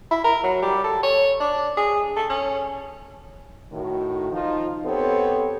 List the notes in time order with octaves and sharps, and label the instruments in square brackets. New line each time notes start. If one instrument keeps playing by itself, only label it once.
[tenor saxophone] E4
A#4
F#3
G3
A4
C#5
D4
G#4
A4
C#4
[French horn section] A2 D#3 F#4
F3 D#4 F4
B3 C4 G4 A4 C5 C#5